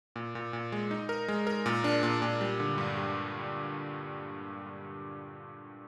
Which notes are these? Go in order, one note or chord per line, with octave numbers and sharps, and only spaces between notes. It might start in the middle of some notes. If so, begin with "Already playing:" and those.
A#2
A#2
A#2
G#3
D#4
A#4
G#3
A#4
A#2
D4
A#2
A#2
G3
D3
G2
G3